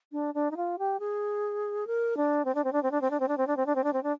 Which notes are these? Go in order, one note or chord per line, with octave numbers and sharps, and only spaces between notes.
D4
D4
D#4
F4
G4
G#4
A#4
D4
C4
D4
C4
D4
C4
D4
C4
D4
C4
D4
C4
D4
C4
D4
C4
D4
C4
D4